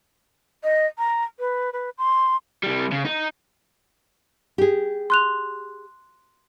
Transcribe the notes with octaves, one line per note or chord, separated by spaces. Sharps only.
D#5
A#5
B4
B4
C6
C2 G3
C#3
D#4
G4 G#4
C6 F#6 F7